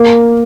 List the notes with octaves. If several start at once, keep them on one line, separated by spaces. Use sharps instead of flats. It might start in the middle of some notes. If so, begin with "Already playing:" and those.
Already playing: A#3